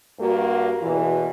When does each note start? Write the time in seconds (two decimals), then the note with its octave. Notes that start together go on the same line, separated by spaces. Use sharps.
0.19 G2 A#3 F#4
0.82 E2 B2 E3